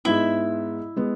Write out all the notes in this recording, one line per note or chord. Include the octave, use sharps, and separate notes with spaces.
G#2 G#3 B3 E4 E5
G#3 B3